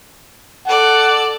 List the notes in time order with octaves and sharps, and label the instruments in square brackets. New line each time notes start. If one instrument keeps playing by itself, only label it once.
[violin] A4 D5 [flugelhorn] F#5